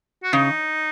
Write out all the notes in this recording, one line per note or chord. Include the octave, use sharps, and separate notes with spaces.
F#4
C#3 D#4